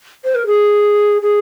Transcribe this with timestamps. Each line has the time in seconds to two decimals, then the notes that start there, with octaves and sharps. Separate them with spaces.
0.25 C5
0.35 A#4
0.46 G#4
1.22 G#4